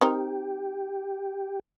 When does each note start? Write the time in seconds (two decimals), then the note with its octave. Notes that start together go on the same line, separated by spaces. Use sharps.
0.01 C4 D#4 G4 A#4